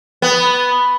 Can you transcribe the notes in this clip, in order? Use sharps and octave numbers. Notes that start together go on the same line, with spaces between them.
B3